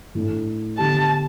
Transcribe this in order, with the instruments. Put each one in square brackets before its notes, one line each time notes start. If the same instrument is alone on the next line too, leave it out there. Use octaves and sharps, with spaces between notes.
[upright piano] A2 A3 D4
[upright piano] D3 B3 G4 [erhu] A5